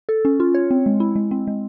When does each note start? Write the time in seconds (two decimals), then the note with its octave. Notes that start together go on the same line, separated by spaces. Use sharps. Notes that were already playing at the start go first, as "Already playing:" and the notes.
0.09 A4
0.25 C#4
0.40 F4
0.54 C#5
0.71 C4
0.86 G#3
1.00 E4
1.16 G#3
1.31 C4
1.47 G#3